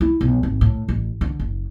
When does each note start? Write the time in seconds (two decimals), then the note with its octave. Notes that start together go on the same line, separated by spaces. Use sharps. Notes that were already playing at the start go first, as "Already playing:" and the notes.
0.01 E4
0.21 B1
0.43 G#1
0.61 A2
0.88 A1
1.21 D3
1.39 F#1